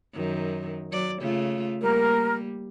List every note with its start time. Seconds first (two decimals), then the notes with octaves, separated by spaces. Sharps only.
0.13 F#2 D#3
0.92 F#3 D5
1.20 C#3 A3 F4
1.81 G3 A#3 A#4